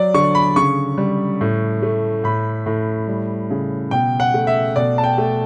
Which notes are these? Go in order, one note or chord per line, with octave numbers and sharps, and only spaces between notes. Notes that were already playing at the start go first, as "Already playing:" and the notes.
Already playing: F#3 D5
D3 C#6
B5
C#3 C#6
G3
A2
A3
A2 B5
A2
G3
C#3
B2 G5
F#5
A3
E5
B2 D5
A5
G5
A3